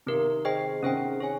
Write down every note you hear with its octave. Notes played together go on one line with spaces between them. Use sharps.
C3 D#3 C4 G4 A#4
G#4 C5 D#5 G5
C3 D#3 C#4 G#4 C5 G5
G#4 C#5 G#5